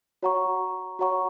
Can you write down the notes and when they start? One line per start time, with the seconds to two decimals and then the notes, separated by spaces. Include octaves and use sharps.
0.23 F#4 C#5 F#5 A#5 C#6
0.99 F#4 C#5 F#5 A#5 C#6